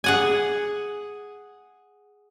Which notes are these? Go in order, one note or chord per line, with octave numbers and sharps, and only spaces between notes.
G#4 F#5 G#5